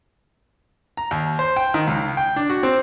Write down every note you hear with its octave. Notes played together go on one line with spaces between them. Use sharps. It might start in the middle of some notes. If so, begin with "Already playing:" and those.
A#5
D#2
C5
G5
D#3
C#2
G5
D4
F#4
C4